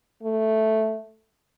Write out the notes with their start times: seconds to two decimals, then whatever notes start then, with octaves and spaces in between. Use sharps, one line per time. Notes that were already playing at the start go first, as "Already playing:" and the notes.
0.23 A3